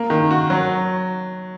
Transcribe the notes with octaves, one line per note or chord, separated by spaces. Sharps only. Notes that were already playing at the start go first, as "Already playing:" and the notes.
Already playing: A#3
D#3
F#4
F#3